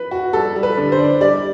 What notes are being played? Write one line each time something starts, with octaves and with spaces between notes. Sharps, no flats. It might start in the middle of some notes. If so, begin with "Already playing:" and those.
Already playing: B4
F#4
G3 A4
G3
B4
D3
C5
D4
G3 D5